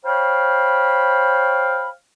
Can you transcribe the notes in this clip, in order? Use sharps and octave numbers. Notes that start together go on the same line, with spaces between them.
C5 C#5 F5 G5 B5